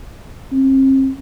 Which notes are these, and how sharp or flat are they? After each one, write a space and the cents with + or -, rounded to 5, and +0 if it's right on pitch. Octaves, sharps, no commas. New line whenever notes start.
C4 +40